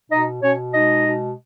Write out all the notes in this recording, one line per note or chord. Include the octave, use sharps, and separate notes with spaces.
B2 D#4 D#5
B2 C#4 C#5
G#3 D#4 D#5
B2